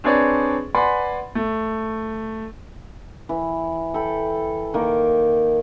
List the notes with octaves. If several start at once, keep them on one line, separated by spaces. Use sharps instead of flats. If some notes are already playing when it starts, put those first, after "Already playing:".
C4 D4 G#4 B4 C#5 D5
B4 D5 F#5 G#5 B5 C6
A3
E3
A4 G5 B5
D#3 A#3